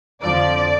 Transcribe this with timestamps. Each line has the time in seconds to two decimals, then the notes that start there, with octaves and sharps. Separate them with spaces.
0.22 F2 D3 F3 D5